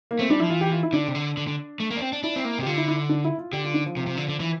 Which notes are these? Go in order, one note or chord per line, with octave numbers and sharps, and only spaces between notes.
A#3
A3 C4
G3 D4
F3 E4
E3 F4
G4
F4
E4
D3 D4
C3
D3
D3
D3
A3
A#3
D4
C4
D4
D4 E4
C4
A#3
C3
G4
D3 F4
E4
E4
D4
E4
F4
D3 G4
F4
D4
F3
C3 F3
C3
D3
D3
E3